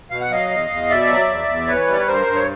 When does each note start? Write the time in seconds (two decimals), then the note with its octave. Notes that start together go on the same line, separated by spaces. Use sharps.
0.10 B2 F5
0.21 F#5
0.30 F#3 D#5 F5
0.51 E2
0.70 E2
0.90 B2 D5 E5
1.08 F#3
1.28 E2
1.49 E2
1.67 E3 B4 C#5
1.87 G3
1.93 D5
2.00 C#5
2.08 G2 A#4 C5
2.27 G2
2.36 C#5